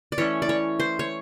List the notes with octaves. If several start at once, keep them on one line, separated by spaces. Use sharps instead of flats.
D5
E3 A3 C#4 C#5
D5
C#5
C5
C#5